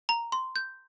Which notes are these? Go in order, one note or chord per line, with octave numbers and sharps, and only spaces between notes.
A#5
C6
G6